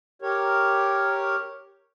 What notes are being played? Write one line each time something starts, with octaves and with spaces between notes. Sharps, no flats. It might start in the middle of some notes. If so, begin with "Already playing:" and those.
G4 A#4 C#5